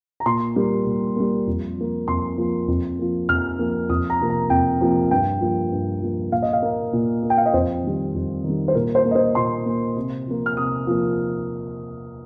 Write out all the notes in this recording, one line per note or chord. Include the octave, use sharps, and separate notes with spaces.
A#5
A#2 C6
G3 A#3
A#2
G3 A#3
F2
F3 A#3
F2 C6
F3 A#3
F2
F3 A#3
F2 F6
F3 A#3
F2 D#6
A#5
C3 F3 A#3
A#5
F2 G5
C3 F3 A#3
G2 G5
F3 A#3
G2
F3 A#3
A#2 F5
D#5
F5
A#3
A#2
A#3
G5
F5
D#5
F2 C5
D#3 G3
F2
D#3
G3
C5
A#2 A#4
C5
A#3
D#5
C5
A#2 C6
A#3
C3
F3 A#3
F6
C3 D#6
F3 A#3